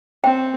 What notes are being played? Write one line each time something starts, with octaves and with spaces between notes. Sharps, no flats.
C4 G5